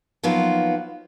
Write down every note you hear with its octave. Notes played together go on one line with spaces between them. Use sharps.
F3 F#3 A#3 B3 D#4 F4